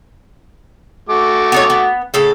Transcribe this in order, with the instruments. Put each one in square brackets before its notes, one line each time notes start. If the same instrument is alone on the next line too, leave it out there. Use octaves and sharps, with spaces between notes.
[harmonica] A3 F#4 D6
[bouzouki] B3 D#4 C#5
B3
A2 C#3 A4